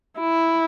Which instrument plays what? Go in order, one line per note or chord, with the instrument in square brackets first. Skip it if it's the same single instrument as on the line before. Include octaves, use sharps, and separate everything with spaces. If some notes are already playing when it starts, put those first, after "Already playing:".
[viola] E4